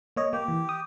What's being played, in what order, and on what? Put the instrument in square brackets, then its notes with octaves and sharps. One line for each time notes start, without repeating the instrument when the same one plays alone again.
[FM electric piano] A#3 C#5 D#5
[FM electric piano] A#3 [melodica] G4
[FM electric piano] E3
D#6